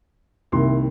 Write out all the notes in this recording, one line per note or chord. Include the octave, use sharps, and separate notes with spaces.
C2 C3 D#3 A#3 C6